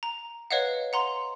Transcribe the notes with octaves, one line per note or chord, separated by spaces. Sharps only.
A#5
B4 C#5 D#5 F5 F#5
F#5 A#5 C6